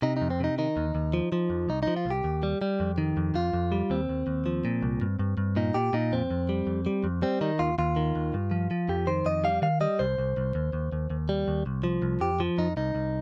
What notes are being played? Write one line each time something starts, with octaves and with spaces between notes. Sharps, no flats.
C3 D#4
F2 D#4
C4
C3 D#4
D#3 D#4
D#2
D#2
F3
F3
F2
C2 D#4
F3 D#4
F4
C2 G4
D#2
G3
G3
F2
D#3
F2
F2 F4
F2
G3
D#2 C4
D#2
D#2
F3
A#2
C2
G2
G2
G2
A#2 D#4
A#2 G4
A#2 D#4
F2 C4
F2
G3
F2
G3
F2
G3 C4
D#3 D#4
D#2 F4
D#2 F4
D#3
D#2
G2
F3
F3
F2 G4
D#3 C5
F2 D#5
G3 F5
D#3 F5
G3 D#5
C2 C5
C2
C2
D#2
D#2
D#2
D#2
G3
D#2
C2
F3
C2
F2 G4
F3
F2 D#4
C2 D#4
C2